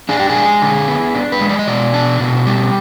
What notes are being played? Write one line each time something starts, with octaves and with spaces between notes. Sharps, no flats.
D4 G#4
G4
G#4
G#3
D3
B3
D4
B4
G#3
D5
D#5
B2 D5
D4
B2
G3